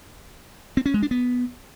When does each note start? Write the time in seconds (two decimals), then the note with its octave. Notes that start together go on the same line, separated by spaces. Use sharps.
0.77 C4
0.86 C#4
0.94 G#3
1.02 D4
1.11 B3